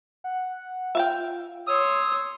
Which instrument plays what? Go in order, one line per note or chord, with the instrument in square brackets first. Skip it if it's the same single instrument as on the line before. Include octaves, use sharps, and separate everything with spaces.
[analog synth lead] F#5
[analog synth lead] F4 [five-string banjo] E5 F5 G5
[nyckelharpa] C#5 C6 [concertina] D#6 [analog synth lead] E6